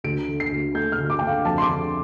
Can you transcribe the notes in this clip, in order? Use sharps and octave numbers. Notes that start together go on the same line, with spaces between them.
D2 D7
D3
C7
D2
A3 G6
F6
D2
D6
D3 G5
F5
F2 A5
C6
D6
D3